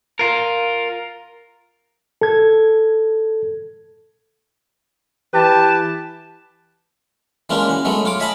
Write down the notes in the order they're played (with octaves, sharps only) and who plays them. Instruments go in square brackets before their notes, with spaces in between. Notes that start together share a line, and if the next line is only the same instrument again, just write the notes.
[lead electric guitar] F4 A#4
[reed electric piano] A4 G#6
[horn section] E3 G4 B4 A5
[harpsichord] E3 G#3 A#3 C#4 D4 F4
F#4
F#3 G#3 A3 B3
F4 C#5 D6
D#5 E5 G#5 A5 B5 D#6